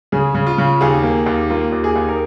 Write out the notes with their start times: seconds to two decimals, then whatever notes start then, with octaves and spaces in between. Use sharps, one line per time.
0.12 C#3 G#4
0.34 C#3
0.46 F4
0.58 C#3
0.81 D#2 G#4
1.03 A#3
1.26 D#2
1.50 A#3 F4
1.72 D#2
1.84 G#4
1.95 D#2
2.09 A#4